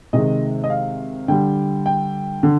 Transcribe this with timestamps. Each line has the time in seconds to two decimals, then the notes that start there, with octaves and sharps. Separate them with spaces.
0.13 C3 D#3 G#3 D#5
0.64 D#5
0.70 F5
1.28 D3 G3 G5
1.86 G5
2.43 D3